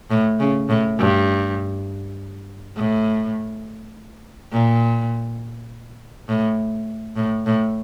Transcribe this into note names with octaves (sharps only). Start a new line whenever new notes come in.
A2
C#3
A2
G2
A2
A#2
A2
A2
A2